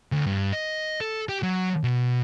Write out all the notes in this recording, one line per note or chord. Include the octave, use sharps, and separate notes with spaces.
D2
G2
D#5
A4
G4
F#3
B2